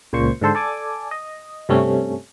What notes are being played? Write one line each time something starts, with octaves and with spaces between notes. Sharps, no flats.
C#2 A#2 C5 C#6
G#2 D3 A4 C5
A4 D5 G#5 D6
D#5
G2 C3 G3 A3 C#4